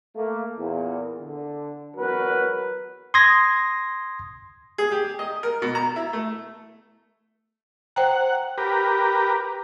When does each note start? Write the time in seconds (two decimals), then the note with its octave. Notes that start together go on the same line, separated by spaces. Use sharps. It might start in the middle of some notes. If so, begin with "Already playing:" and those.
0.16 A3 A#3
0.57 E2 A#2
1.21 D3
1.96 G#1 E2 F#3 F#4 A#4 B4
3.14 C6 D#6 G#6 A#6
4.78 G#4
4.92 G4
5.19 D#5
5.43 A#4
5.62 B2
5.75 A#5
5.96 E4
6.13 A3
7.96 C5 F#5 G5 A#5
8.58 G4 A#4 B4